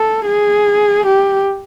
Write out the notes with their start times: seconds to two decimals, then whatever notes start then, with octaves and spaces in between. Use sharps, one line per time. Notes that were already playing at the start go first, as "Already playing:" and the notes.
Already playing: A4
0.26 G#4
1.06 G4